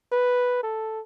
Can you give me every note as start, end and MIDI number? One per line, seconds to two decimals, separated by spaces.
0.12 0.61 71
0.63 1.01 69